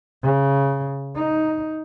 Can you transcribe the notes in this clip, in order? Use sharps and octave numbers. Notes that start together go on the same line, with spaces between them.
C#3
D#4